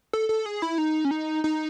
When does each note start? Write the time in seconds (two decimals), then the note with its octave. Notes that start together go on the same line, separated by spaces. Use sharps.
0.13 A4
0.29 A4
0.46 G#4
0.62 E4
0.78 D#4
1.05 C#4
1.11 D#4
1.44 D#4